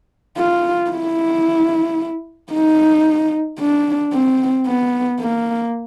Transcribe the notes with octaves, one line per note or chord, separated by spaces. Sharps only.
F4
E4
D#4
D4
C4
B3
A#3